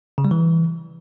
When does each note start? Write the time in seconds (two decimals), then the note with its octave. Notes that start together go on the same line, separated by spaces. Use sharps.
0.18 C#3
0.25 G3
0.31 E3